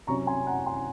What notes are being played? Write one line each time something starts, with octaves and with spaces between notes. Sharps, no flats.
C3 F#3 C#4 A#5 C#6
G#5 C6
F#5 A#5
G#5 C6